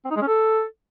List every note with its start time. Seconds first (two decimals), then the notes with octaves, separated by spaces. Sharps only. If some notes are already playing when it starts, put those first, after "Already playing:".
0.05 C4
0.10 D#4
0.16 G#3
0.22 C#4
0.27 A4